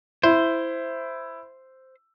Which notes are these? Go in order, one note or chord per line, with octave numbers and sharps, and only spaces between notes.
E4 C5